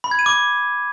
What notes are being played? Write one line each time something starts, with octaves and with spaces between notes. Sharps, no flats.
B5
G#6
D#7
D6